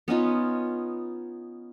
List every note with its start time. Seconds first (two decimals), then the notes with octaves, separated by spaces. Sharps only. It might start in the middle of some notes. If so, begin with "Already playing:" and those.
0.08 B3 C#4 D#4 F4